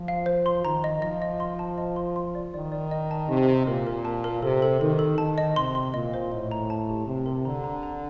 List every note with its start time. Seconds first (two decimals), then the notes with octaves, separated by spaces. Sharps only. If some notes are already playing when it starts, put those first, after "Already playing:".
Already playing: F3
0.08 F5
0.26 C5
0.46 C6
0.64 D#3 A#5
0.84 D#5
1.02 F3 D#5
1.22 D#5
1.40 C6
1.59 A5
1.78 D#5
1.96 C6
2.16 C6
2.35 D5
2.54 D#3 D5
2.72 D5
2.91 D#5
3.11 A5
3.29 C3 D#5
3.49 D#5
3.67 A#2 A#4
3.87 A#4
4.05 A5
4.24 A#4
4.42 C3 A4
4.62 A4
4.81 D#3 A4
4.99 A4
5.18 D#3 A5
5.38 D#5
5.56 C3 C6
5.75 C6
5.94 A#2 D#5
6.14 C5
6.32 A2 D#5
6.51 A#5
6.70 A5
6.89 G4
7.07 C3 A5
7.26 A#4
7.45 D3 A#5
7.64 A#5
7.83 A#5